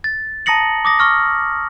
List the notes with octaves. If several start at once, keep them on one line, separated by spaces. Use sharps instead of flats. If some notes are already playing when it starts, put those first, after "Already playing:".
A6
A5 A#5 D#6 A#6 C#7 F#7
D6 D#6 A#6
C#6 F6 A#6